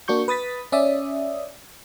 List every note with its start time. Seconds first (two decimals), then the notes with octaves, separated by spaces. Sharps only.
0.08 A#3 D4 F#4 C#6 G6
0.28 B4 D#6 A6 B6
0.72 C#4 D5 E5 D#6